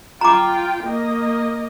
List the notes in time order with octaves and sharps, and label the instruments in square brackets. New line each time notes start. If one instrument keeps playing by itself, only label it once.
[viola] F4 G5 [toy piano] A#5 D6
[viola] A#3 D#5